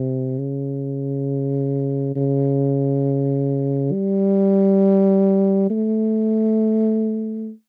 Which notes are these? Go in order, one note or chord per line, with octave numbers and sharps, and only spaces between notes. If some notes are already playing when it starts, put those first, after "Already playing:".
Already playing: C3
C#3
C#3
G3
A3